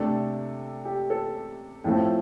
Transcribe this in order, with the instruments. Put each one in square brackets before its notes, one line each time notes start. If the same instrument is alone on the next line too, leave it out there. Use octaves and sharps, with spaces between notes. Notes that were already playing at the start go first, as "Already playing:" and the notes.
Already playing: [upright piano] C3 A3 D4 A4
G4
A4
A2 F3 A3 C4 F4